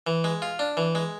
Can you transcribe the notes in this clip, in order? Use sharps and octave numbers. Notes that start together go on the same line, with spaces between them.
E3
G#3
F4
D4
E3
G#3